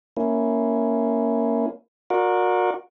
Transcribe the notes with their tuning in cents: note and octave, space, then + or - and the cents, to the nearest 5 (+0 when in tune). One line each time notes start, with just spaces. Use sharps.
A#3 +0 C#4 +10 E4 +0
F#4 -30 A#4 +0 D5 +0